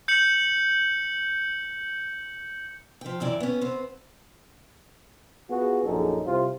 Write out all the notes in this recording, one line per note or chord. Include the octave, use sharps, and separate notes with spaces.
G6 C#7 F#7
F3 G5
F#2 E3 E4 D5
B3 C#4
B3 C4
B3 F4 F#4 G#4
A#1 F#2 D#4 G#4 A4
C2 C3 F4 C5